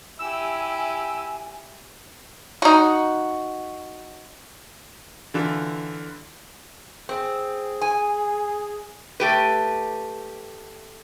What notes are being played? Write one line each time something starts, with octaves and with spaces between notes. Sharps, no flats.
E4 G4 G#5 E6
D#4 F#4
D3 E3 F4
C4 G#4
G#5
A3 G4 B4